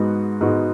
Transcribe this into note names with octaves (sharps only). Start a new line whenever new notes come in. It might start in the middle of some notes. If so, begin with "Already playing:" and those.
Already playing: G#2 G#3 B3 F#4
G#2 G#3 B3 F#4